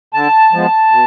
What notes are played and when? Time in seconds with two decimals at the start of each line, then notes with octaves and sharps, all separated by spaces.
0.14 D3 A5
0.53 F3 G#3 B3
0.91 B2